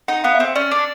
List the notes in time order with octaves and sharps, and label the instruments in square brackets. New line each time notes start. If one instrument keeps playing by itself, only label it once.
[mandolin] D#4 [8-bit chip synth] F#5
[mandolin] B3 [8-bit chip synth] F5
[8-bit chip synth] E5
[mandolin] C4
[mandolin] C#4 [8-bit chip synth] D5
[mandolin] D4